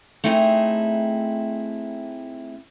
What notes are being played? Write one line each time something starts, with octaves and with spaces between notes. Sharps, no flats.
A3 C4 D#4 E4 F#4 G#4